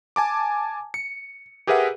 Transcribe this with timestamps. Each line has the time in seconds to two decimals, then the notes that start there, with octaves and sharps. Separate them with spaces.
0.16 G#5 A5 D6
0.94 C#7
1.67 G4 G#4 A#4 B4 E5 F#5